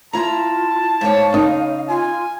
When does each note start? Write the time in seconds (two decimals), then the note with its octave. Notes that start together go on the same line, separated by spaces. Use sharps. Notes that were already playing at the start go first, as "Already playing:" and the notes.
0.13 E4 F4 A5 A#5
1.01 G#2 C#5 F5
1.34 C#3 D#4
1.88 F4 G#5